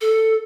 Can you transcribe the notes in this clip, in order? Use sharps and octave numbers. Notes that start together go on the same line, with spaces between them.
A4